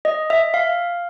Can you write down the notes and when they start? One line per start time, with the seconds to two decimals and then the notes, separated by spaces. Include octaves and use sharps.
0.05 D#5
0.30 E5
0.54 F5